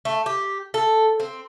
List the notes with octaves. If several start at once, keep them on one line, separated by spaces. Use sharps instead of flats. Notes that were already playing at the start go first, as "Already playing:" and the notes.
A3
G4
A4
C4